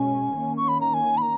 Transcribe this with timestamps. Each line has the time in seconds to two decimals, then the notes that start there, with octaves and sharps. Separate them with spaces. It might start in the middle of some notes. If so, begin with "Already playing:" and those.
Already playing: B2 G#3 C#4 G#5
0.35 D#3 A#3 C#4
0.57 C#6
0.68 B5
0.81 A#5
0.94 G#5
1.17 B5
1.22 A#5